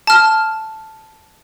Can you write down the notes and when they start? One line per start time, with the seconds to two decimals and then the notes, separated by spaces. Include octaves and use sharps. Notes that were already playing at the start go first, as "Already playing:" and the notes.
0.07 A5 F6